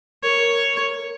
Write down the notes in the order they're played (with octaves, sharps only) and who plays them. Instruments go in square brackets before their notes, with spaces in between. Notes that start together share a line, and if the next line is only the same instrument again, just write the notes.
[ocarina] A#4 [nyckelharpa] C#5